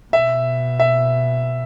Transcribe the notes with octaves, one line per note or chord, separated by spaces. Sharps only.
B2 E5
E5